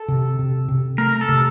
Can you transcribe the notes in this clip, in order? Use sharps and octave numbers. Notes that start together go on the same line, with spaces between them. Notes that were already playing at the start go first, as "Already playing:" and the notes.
Already playing: A4
C3
C3
C3
A3 A#4
A4
C3